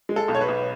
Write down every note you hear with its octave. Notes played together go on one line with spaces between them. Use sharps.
G#3
A4
B1
C#5
B4
B1